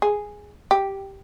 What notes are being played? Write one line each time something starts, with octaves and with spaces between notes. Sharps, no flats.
G#4
G4